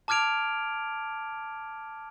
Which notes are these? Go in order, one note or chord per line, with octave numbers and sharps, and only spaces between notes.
A5 D6 F6 G#6 D7 F7